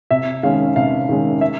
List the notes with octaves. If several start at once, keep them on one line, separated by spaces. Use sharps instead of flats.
C3 E5
D#3 G#3 C#4 F5
C3 F5
D#3 G#3 C#4
E5